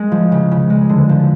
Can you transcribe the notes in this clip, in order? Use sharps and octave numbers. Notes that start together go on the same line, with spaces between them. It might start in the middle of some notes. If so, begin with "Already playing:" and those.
Already playing: G#3
F3
C#3
C#3
G#3
D3
F3